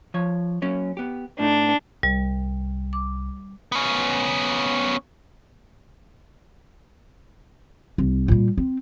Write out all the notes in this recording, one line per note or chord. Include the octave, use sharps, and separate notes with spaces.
F3 C#5
F#3 A#3 C#4
B3 G4
A2 A3 D4 D#4
C2 G3
D6
B3 C#4
C2
A#2 G3
C4